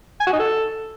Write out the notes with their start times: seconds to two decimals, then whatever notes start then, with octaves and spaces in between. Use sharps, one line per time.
0.20 G#5
0.27 F#4
0.33 D#4
0.39 A4